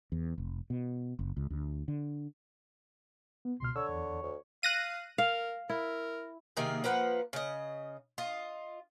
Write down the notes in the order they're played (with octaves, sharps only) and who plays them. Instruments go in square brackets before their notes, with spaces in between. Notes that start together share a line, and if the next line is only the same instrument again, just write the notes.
[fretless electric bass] E2
F1
B2
F#1
C#2
D2
D3
[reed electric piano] B3
[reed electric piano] C#2 B2 F6 [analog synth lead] C6
[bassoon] D3 [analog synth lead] C#5 [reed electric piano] E6
[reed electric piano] E2
[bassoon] D2
[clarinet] F5 [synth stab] F#6 A#6 D#7
[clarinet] A#4 [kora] F5
[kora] E4 [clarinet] A#4
[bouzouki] C3 D#3 A#3 G#4
F3 A#3 B4 F#5
C#3 D#5
F4 D#5